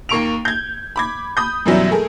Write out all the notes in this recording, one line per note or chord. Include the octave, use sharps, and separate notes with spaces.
D#2 A#3 C#6 D7 F7
G6 G#6
B5 D6 G#6
B5 D#6 G6
F#2 B2 E3 F#3 G3 E4
A3 G#4 A#4